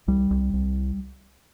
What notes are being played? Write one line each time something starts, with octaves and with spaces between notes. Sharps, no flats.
C2 G3
C2
C2